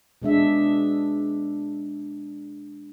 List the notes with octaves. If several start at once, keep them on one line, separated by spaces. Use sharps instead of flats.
B2 G#3 D4 E5